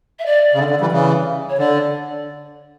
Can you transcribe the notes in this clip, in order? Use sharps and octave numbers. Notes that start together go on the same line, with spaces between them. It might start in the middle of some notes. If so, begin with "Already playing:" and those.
E5
D5
C#3
D3
D3
E3 G3
C#3 E3
C#5
D3 D5